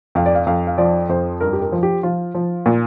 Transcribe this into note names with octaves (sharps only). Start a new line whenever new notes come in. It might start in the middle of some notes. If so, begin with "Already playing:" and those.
F2 F5
D5
F5
F2 F5
F5
F3 D5
F2 C5
G2 A#4
G4
A#4
F3
G4
F3 F4
F3
A#2